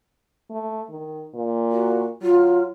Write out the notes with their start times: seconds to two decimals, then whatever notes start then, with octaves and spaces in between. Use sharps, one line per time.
0.51 A3
0.90 D#3
1.35 A#2
1.71 F#4
2.22 F#3 F4